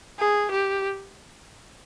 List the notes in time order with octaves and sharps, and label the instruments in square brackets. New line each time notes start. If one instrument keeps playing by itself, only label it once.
[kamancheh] G#4
G4